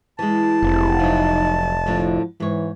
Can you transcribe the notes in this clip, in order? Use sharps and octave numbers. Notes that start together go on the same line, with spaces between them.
E3 G#3 A5
F1 C3
F3 F#3 D#4
A2 D3 F3 D4
G#2 E3 C#5